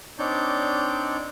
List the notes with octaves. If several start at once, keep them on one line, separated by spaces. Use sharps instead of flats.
C4 D4 D#4 C#5 D5 G6